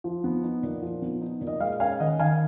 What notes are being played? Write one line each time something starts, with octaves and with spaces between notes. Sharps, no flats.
F3
B3
D#4
A#2
F3
B3
D#4
A#2
D#5
G#3 F5
C#4 F5 G#5
D#3 D#5 F#5
D#3 F5 G#5